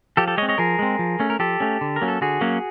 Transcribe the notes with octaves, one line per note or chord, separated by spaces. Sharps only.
F3 G4 A4
G4 A4
G#3 C4 C#5 D#5
C#5 D#5
F3 G#4 A#4
G#3 C4
F3
A3 C#4
A#4
F3 G4 A4
A3 C#4
D3
A#4
F#3 A#3 C#4
A4
D3 F#4 G#4
F#3 A#3 C#4